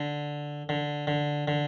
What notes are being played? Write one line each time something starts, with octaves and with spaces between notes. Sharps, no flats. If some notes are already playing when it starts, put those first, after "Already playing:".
Already playing: D3
D3
D3
D3